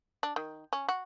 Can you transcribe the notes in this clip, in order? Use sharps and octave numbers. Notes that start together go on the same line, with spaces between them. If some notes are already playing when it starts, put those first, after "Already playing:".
D4
D#3
C#4
F#4